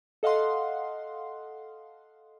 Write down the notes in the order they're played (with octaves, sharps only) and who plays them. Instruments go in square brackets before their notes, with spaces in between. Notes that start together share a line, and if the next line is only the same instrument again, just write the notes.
[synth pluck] A4 D#5 F5 F#5 C6